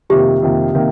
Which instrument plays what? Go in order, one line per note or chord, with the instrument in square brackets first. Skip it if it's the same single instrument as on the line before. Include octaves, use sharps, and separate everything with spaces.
[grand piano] F2 C3 D#3 A#3 [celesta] G4
[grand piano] F2 C3 D#3 A#3
C3 D#3 A#3